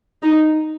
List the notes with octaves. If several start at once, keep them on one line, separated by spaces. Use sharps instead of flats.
D#4